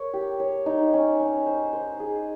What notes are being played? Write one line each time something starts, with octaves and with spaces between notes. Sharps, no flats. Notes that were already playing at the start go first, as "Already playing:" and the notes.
Already playing: A#4 C#5
G4
C#5
D#4
C#4
C#4
C5
C5
G#4